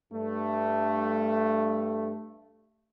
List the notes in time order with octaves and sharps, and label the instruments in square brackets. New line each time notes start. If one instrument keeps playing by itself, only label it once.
[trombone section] G2 A3